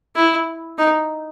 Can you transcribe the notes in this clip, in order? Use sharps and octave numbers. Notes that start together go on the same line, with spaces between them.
E4
D#4